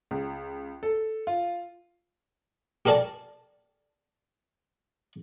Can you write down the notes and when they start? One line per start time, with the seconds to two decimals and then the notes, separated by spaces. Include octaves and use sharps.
0.11 C#2
0.83 A4
1.27 F4
2.85 G4 A4 A#4 D5 G#5 A5